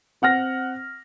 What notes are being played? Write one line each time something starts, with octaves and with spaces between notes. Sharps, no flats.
C4 F#5 F6 A#6